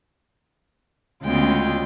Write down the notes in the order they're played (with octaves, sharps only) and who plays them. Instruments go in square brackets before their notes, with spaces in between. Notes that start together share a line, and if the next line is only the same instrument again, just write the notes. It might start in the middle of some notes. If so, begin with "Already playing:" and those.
[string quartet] D2 C#3 G#3 B3 F4 G5